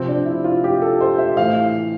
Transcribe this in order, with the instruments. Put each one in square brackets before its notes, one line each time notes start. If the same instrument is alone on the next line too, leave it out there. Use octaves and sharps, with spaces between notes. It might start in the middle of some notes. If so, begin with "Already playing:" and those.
Already playing: [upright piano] C3 F3 C4
D4
E4
F4
G4
A4
C5
E5
A2 E3 F5